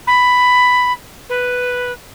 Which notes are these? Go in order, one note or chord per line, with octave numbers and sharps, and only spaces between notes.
B5
B4